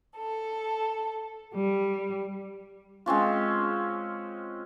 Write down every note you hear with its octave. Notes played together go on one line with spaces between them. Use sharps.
A4
G3
G#3 C4 C#4 F4